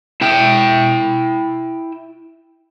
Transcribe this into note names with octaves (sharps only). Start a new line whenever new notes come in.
E4 E5 G5